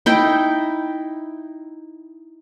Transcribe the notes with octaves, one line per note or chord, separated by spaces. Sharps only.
D#4 E4 G5